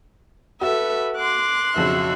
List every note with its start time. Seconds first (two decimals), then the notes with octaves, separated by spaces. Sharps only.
0.61 F#4 A4 B4 E5
1.17 C6 D6 F#6
1.76 B1 F2 C#3 F#4 E5